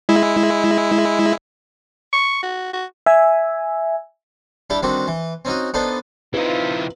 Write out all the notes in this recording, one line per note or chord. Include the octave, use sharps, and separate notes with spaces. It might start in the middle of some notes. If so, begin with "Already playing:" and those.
G#3 E4
C#6
F#4
F#4
E5 G#5
G3 D4 E4 G4
D3 D#3 G3 C4 F#4
E3
C4 C#4 D#4 F#4
B3 D4 D#4 A4 C5
E3 C4 D#4 F4 B4 E5